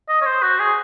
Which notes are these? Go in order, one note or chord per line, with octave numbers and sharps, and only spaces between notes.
D#5
C#5
C5
F#4
G#4